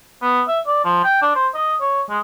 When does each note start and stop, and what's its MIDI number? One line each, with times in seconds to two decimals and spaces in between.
0.22 0.41 59
0.48 0.60 76
0.66 0.80 74
0.84 1.01 53
1.04 1.17 79
1.22 1.33 62
1.35 1.47 72
1.54 1.74 75
1.81 2.02 73
2.09 2.19 56